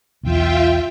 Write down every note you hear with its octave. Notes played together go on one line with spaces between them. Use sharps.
B1 E2 F4 E5 G5